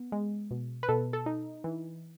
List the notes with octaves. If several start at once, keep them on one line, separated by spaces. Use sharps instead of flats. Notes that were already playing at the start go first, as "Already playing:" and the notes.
Already playing: B3
G#3
B2
B4
B2 A4
A4
D#4
E3